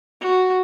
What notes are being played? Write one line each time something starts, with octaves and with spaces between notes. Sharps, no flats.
F#4